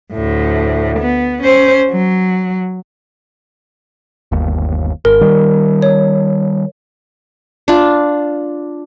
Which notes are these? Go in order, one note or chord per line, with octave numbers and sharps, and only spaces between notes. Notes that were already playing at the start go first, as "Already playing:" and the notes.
D2 A2
B3
C#4 C5
F#3
G1 D#2
G#1 A#4
D#3 G3
C#5
D4 F4